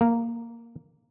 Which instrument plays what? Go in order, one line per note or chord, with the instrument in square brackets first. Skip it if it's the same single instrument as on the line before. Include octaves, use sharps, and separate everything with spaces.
[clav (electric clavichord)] A#3